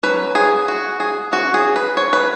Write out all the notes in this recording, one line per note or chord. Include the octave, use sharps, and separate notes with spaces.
F#3 C#4 B4
G#4
F#4
G#4
E3 C#4 F#4
G#4
B4
C#5
B4